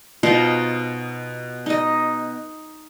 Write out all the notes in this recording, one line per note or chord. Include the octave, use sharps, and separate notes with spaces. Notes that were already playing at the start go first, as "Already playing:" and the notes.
B2 D#4 F4 C5
D#4 D#5